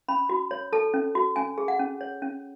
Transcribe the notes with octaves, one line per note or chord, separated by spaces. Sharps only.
C#4 B5
F#4
C#5
A4 A5
C#4
F#4
C#4 G#5
G#4
F#5
C#4
C#5
C#4